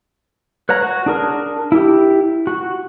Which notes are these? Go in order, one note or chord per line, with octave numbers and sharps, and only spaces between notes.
B4 C#5 F#5 A#5
F#4
D4 G#4 A#4
E4 G4
F#4